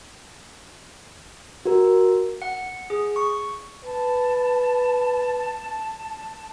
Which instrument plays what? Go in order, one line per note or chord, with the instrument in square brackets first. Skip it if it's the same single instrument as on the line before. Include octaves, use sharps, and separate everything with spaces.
[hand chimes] F#4 A#4
[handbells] F#5
G#4
C#6
[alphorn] B4 [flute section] A5